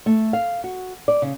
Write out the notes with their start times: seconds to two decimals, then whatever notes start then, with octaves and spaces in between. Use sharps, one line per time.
0.06 A3
0.33 F5
0.64 F#4
1.08 D5
1.22 C#3